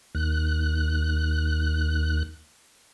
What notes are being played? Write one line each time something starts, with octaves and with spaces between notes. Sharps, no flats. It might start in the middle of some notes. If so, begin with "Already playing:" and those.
D#2 F#6